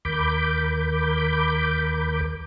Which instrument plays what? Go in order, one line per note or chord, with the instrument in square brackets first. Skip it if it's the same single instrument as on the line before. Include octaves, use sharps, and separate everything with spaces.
[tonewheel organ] D#2 A#4 B5 D6 G6